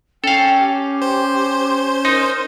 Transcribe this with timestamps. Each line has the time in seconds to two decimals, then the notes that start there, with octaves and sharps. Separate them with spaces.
0.24 C#4 A4 F5 G5
0.59 G4
1.02 C5
2.05 D#4 A#4